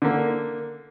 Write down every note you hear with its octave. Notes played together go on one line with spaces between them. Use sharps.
D3 A#3